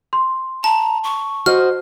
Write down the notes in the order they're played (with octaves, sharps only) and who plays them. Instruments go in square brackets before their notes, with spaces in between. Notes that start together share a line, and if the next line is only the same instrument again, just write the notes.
[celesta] C6
[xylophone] A5 [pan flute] A#5
[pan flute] C#6
[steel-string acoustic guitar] F#4 C5 D#5 [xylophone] F6